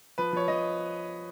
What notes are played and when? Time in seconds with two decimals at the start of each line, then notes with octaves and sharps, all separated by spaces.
0.18 F3 B4
0.33 F3 C#5
0.48 F3 D#5